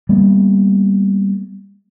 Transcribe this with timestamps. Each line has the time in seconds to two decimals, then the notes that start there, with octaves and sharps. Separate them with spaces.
0.09 G3 A#3 B3